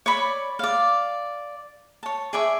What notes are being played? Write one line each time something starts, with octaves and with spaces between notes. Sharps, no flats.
C#5 D5 B5
D5 F5
C#5 A5
G#4 D5 E5 C#6